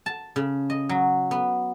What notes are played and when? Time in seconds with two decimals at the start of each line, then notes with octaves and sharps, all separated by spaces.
0.06 A5
0.36 C#3
0.70 D#5
0.89 F#3
1.31 B3